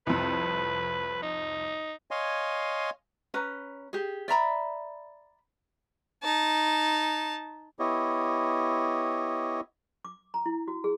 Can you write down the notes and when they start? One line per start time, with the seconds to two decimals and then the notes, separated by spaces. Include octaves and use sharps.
0.07 C2 F2 B4
1.22 D#4
2.11 C#5 D#5 F5 G#5 C6
3.34 C#4 B4 A#5
3.93 G4 G#4
4.28 D5 E5 A#5 B5
6.23 D#4 A5
7.79 B3 E4 G4 C#5 D#5
10.05 D6
10.34 A#5
10.46 E4
10.68 F#4
10.84 G#4